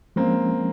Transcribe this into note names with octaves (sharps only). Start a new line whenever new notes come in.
F3 G#3 A#3 C4 C#4